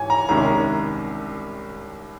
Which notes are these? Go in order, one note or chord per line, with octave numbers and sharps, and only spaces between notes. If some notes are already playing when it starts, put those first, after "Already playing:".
Already playing: G#2 E3 C#5 G#5
A#5
C2 C3 D#3 G#3 C#4 A#5